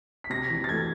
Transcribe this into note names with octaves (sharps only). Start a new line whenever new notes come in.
B6
C3 A#6
E3
A6
A3 G#6